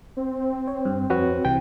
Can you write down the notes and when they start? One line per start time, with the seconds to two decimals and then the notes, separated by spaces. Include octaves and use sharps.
0.17 C4
0.68 C#5
0.85 G2
1.10 F2 F#4 B4 C#5
1.45 C2 C3 E3 G5